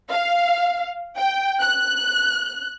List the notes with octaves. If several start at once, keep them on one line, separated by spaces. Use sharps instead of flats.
F5
G5
F#6